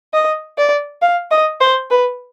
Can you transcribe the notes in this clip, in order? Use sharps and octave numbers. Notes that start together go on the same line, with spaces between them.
D#5
D5
F5
D#5
C5
B4